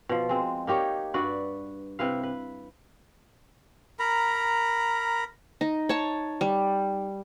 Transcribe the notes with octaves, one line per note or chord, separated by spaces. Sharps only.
B2 F3
G#3 C4
A#3 D#4 G4 C#5
G2 F#4 B4 D5
C3 E4 B4 F5
B4
A#4 A#5 B5
D#4
C#5 A5
G3